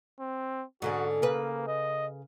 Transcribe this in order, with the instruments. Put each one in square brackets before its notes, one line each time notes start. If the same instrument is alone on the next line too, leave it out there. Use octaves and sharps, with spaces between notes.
[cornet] C4
[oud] G#2 D3 C#4 [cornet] F#4
[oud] C#3 B4 [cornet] A#3
[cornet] D#5